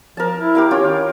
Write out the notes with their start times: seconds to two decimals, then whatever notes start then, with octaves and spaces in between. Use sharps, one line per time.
0.17 F3 A#4 A5
0.36 E4
0.55 G4 A#4 F5
0.71 C#4 F4 G4 C#5
0.83 D#3